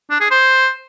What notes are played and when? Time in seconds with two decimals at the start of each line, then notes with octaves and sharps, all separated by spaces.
0.10 D4
0.21 G#4
0.31 C5